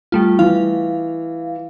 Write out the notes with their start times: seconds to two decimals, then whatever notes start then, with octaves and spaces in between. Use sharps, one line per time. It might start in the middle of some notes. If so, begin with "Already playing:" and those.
0.12 G3 A3 F4
0.39 E3 F5